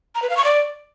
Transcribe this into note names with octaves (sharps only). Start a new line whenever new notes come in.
A#5
B4
F5
C#6
D5